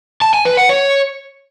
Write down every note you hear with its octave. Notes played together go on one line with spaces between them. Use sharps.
A5
G#5
B4
F#5
C#5